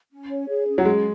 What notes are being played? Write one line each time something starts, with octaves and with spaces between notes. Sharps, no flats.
C#4
C#5
G#4
C#4
F#3
G#3 G#4